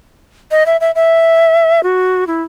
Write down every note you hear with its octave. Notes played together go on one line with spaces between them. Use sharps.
D#5
E5
E5
E5
F#4
E4